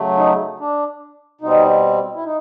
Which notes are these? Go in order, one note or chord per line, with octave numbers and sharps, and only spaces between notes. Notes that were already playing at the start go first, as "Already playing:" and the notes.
Already playing: C#3 F#3 A3
D#4
D4
B2 G3 C4 D#4
E4
D#4